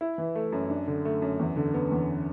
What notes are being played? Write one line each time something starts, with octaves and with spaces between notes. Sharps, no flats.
E4
E3
A3
F#2
D4
D3
A3
F#2
E2
D3
B3
E2